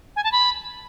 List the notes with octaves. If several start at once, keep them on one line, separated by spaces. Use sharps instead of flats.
G#5
A5
B5